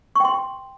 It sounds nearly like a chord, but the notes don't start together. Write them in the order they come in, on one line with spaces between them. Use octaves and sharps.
C#6 G5 C6